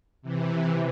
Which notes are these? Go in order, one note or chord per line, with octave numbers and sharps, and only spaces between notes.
C3 E3